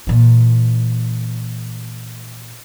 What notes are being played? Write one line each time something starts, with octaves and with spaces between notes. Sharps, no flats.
A#2 E3